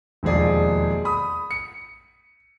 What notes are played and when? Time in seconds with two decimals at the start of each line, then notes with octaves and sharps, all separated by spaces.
0.23 E1 D#2 F3 G#4 D5
1.05 B5 D#6
1.51 C#7